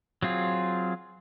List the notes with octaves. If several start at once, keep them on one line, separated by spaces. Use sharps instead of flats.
F#3 C4 F4 G#4